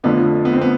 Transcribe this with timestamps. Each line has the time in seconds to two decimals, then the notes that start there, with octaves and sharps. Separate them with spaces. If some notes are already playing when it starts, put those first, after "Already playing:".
0.03 F2 D3 F3 A3 B3 D4
0.45 B3
0.53 C4
0.61 B3